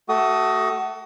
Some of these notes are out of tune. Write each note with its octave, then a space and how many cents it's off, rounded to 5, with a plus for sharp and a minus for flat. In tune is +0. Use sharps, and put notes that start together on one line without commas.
A3 +0 F#4 +30 D#6 +5